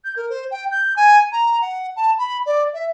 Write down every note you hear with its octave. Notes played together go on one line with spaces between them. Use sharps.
G6
A#4
C5
G5
G6
G#5
A#5
F#5
A5
B5
D5
E5